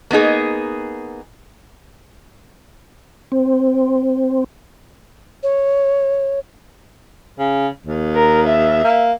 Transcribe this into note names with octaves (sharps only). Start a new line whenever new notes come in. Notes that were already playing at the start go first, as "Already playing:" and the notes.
A#3 B3 D#4 G#4
C4
C#5
C#3
D#2
A#4
E5
A#3